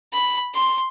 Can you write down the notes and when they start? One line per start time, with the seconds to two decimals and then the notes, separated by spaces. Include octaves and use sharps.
0.12 B5
0.54 C6